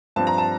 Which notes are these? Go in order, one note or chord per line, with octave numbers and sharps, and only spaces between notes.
G2 F3 C4 A5
A#5
A5